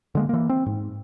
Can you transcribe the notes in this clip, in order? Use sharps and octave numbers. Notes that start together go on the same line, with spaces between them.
D3 G#3 A#3
E3 A#3
C4
G#2